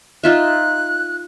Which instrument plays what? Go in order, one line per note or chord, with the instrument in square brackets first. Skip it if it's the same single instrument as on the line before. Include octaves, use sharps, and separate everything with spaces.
[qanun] D#4 F4 E5 [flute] F#6